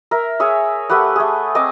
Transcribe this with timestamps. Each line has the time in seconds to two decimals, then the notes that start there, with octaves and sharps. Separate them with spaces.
0.11 A#4 E5
0.40 G#4 C#5 E5
0.89 A3 G4 B4 F#5
1.16 A3 G#4
1.55 C4 D#5 G#5 D6